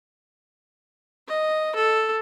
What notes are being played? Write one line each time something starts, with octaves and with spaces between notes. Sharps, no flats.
D#5
A4